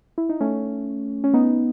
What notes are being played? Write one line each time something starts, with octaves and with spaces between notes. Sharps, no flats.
E4
D#4
A3 C#4
C#4
B3 D#4